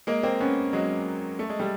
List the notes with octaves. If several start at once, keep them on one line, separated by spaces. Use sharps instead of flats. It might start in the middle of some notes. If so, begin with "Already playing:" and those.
G#3 A#3
A#3 C4
B3 C#4
F#3 G#3
A3
G#3
G3 A3